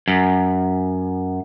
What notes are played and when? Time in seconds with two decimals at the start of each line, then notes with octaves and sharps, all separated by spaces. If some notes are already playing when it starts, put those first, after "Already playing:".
0.08 F#2